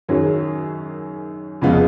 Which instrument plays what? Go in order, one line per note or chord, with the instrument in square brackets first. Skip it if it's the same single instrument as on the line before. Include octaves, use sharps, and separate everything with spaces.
[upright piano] F#2 D#3 F#3 C#4 G#4
F2 C#3 G#3 B3 F4